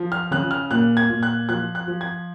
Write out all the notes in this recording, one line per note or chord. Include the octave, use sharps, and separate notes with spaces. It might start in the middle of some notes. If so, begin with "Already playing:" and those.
Already playing: F3
F6
C#3 F#6
F6
A#2 F#6
G#6
A#2
F#6
F3 F#6
F#6
F3
G#6